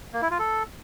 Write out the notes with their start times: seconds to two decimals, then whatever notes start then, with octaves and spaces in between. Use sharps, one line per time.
0.14 A#3
0.22 E4
0.31 F4
0.39 A4